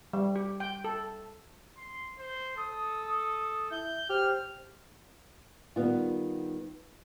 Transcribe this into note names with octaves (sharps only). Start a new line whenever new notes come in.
G3
G4
G5
A4
C6
C5
A4 D#6
E4 G6
G4 C5 F6
D#3 G3 B3 F4